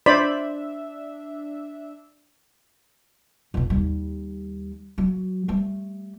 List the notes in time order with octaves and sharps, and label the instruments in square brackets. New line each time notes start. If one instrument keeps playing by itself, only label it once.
[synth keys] D4 E5 [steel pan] C5 D5 B5
[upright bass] F2 B2
D#2 G3
F#3
G3 A3